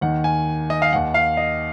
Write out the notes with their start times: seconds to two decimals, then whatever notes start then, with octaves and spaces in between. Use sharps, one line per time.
0.01 D#2 D#3 F#5
0.24 G#5
0.70 D#5
0.82 F5
0.92 D#2 D#3 F#5
1.14 F5
1.37 D#5